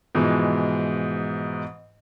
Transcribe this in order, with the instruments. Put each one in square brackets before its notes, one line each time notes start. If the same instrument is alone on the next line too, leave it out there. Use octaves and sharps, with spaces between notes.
[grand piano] G#2 B2 E3 F3 G#3